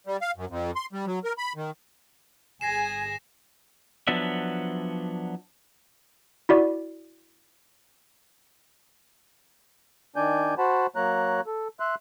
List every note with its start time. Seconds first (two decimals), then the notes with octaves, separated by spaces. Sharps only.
0.07 G3
0.21 F5
0.36 F#2
0.50 F2
0.76 C6
0.93 G3
1.07 F#3
1.24 A#4
1.38 B5
1.56 D#3
2.61 G1 G#4 G#5 A#6 C7 E7
4.07 F3 F#3 B3 D4 E5
6.49 E4 F#4 D5
10.16 D#3 D4 D5 G#5 G6
10.58 F#4 C5 F#5 A5 B5
10.96 F#3 A#3 C#5 A#5 F#6
11.46 A4
11.80 E5 C6 F#6